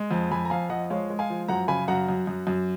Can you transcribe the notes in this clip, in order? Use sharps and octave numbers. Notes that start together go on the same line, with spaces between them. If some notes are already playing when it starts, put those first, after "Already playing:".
Already playing: G#3
F2
F2 G#5 B5
A#5
F2 F5 G#5
F3 D#5 F#5
G#3 C#5 F5
G#3
F5 G#5
F3
F#2 F#5 A#5
C#3 G#5 B5
F#2 F#5 A#5
F#2
F#2
F#2